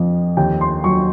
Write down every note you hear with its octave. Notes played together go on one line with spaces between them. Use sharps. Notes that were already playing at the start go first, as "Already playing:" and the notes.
Already playing: F2 F3
D#2 G5
C6
F#3 C#6